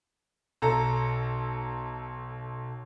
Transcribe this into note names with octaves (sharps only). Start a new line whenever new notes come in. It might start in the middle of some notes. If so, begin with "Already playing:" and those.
B1 A4 A#5